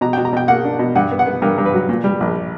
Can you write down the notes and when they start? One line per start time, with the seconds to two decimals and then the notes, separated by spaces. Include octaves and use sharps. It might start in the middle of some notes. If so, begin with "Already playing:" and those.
0.01 B2 A#5
0.13 B2 G5
0.25 A#5
0.33 B2 G5
0.48 A#3 F#5
0.64 D4
0.79 B2
0.95 G2 F#5
1.11 B3
1.19 F#5
1.26 B3
1.42 G2 A#4
1.58 G2
1.66 B4
1.74 F#3
1.89 A#2
2.04 G3
2.20 A#1